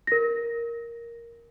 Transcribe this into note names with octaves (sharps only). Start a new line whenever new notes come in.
A#4 A#6